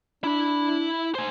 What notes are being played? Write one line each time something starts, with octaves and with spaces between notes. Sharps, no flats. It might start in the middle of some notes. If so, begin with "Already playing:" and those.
D4 E4 B5
C5 G#5